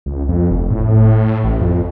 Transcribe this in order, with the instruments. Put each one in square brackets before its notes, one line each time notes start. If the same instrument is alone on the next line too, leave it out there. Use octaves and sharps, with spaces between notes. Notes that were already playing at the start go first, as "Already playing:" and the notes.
[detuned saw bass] C#2
F2
F1
A2
A1
F2